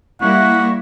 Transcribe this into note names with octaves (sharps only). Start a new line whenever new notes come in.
G3 A#3 E4 F#5 C#6